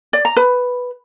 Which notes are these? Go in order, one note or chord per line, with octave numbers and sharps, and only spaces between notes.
D5
A#5
B4